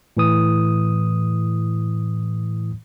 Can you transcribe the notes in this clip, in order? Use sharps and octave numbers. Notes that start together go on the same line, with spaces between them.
A2 E3 D#6